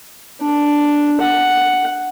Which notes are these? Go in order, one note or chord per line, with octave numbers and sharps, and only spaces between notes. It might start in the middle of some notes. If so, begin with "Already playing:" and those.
D4
F#5